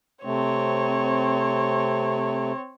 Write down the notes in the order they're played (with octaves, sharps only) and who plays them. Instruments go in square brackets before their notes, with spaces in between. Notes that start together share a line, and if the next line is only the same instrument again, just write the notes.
[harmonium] C3 A3 [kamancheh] C4 C#5